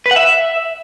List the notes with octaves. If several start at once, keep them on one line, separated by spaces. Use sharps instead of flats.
B4
F#5
E5